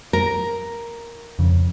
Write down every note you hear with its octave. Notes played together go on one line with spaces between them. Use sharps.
A#4
F2 C#3